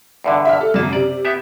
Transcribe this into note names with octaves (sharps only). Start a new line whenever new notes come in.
E2 G2 D3
E5 F6
A4
F#2 C#3 A#3 A5
C3 D5
B3 G4 E5